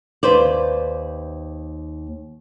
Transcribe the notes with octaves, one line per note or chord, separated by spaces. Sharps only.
D#2 B4 C5 D5